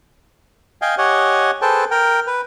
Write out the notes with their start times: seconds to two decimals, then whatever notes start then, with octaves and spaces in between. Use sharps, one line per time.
0.82 D#5 F5 G5 G#5
0.98 G4 C#5 D#5 F#5 G#5
1.62 G#4 A4 B4 C5 G5 A5
1.91 A#4 G5
2.27 B4